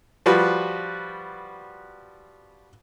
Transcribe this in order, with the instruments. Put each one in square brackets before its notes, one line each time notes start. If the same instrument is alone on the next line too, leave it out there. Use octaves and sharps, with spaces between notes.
[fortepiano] F3 G3 F#4 B4